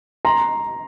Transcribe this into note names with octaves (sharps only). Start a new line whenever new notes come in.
A#5 C6